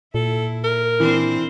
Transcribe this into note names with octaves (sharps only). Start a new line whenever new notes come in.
A#2 E4 A4
A#4
E3 C4 D4 C5